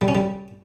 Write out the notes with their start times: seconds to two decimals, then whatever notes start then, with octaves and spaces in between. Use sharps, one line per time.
0.01 G3
0.08 C#4
0.15 G3